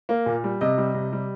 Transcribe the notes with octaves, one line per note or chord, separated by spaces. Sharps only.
A#3
A#2
G3
C3 D#5
G3
C3
G3